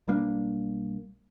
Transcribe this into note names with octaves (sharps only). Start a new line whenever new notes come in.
B1 G3 A#3 D4